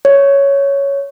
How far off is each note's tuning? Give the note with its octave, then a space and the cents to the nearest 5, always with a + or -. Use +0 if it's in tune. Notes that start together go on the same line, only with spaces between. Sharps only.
C#5 +5